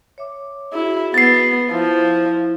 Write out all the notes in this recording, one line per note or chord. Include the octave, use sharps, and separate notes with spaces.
C#5 E5 D6
E4 F#4 G#4
B3 A6 C7
F3 E4 E5